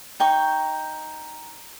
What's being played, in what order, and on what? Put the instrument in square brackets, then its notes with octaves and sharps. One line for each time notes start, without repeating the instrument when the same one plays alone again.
[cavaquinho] D#4 G5 C#6